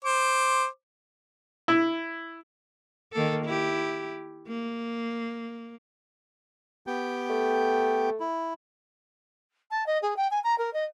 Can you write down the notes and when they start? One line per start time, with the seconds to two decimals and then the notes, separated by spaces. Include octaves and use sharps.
0.05 C5 D6
1.68 E4
3.13 D#3 A#3 A4
3.45 E4 G4
4.48 A#3
6.87 B3 G4 G5
7.30 A3
8.20 E4
9.71 A5
9.86 D#5
10.02 G#4
10.16 G5
10.31 G#5
10.44 A#5
10.58 A#4
10.73 D#5